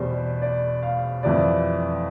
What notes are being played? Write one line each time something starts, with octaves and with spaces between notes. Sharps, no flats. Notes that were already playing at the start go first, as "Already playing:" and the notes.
Already playing: E2 B2 G3 C5
D5
F5
F2 E3 G3 D5